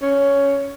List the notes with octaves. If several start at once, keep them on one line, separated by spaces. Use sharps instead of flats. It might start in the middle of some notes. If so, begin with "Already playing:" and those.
C#4